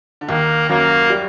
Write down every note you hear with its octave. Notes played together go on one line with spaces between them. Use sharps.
D3
D#2 D#3 A#3
F#2 F#3 A#3
G3